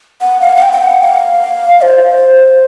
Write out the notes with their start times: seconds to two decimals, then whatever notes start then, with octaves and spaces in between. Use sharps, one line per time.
0.21 F#5
0.41 F5
0.56 F#5
0.62 G5
0.73 G5
0.81 F#5
1.01 F5
1.82 C5